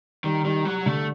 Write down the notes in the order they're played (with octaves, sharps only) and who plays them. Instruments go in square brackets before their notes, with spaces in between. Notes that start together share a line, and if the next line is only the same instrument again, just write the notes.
[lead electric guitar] D#3 [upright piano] G3
[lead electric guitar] D#3 [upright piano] G3
[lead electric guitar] F#3 [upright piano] G3
[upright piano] D3 [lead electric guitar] A3